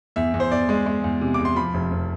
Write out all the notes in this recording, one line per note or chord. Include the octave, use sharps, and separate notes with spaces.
E2 E5
E2
C5
E2 D5
G#3
G#3
E2
C3
E2 D6
C6
F3 B5
F1
F1